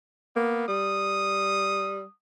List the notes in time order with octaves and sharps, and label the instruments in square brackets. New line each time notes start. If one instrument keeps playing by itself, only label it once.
[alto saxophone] A#3 [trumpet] B3
[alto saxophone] G3 [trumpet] D#6